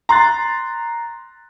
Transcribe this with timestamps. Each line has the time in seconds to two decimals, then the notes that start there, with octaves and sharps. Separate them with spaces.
0.09 A#5 C6 F#6 A6